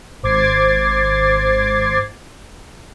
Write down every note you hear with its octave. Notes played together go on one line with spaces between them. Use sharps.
G#1 C5 D6 G#6 A6 C7